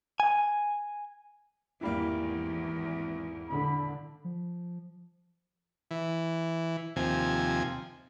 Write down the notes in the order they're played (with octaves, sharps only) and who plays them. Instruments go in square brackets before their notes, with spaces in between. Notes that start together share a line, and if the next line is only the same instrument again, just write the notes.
[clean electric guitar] G#5
[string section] G#1 E2 [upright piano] E3 G3 A#3
[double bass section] D3 [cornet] B5
[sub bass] F3
[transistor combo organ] E3
D#2 C3 F3 G#5